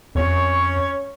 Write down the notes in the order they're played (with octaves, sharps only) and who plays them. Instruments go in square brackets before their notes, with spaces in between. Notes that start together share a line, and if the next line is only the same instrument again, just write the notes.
[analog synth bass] F2 [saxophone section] C#4 C#5